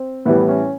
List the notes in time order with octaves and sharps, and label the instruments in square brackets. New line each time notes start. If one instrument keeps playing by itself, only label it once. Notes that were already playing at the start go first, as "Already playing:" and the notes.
Already playing: [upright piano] C4
A2 E3 G3 B3
C#4